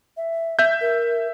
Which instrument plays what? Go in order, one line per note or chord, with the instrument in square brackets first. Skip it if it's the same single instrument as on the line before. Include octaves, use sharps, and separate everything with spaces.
[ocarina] E5
[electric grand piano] E5 G6
[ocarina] A#4